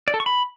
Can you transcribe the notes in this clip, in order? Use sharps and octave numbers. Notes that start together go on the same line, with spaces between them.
D5
A4
C#6
B5